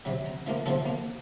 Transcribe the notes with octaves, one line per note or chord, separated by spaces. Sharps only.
C3 F#3
A#5
F3 A3 A#3 A#4
C3 F3 F#3 C4 A4
A#3